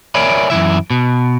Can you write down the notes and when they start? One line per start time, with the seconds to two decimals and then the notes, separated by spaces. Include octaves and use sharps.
0.15 A#4 C#5 D5 E5 G#5 B5
0.50 F#2 D#3 E3 E5
0.90 B2